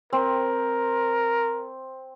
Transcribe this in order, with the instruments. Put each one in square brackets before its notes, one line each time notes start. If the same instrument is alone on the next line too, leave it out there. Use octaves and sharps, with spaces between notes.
[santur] C4 [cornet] A#4